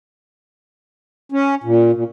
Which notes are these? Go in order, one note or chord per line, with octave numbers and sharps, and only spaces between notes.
C#4
A#2
A#2